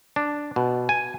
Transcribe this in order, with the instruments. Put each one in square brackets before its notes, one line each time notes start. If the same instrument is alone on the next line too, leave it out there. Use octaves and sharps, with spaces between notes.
[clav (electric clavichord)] D4
B2
G#5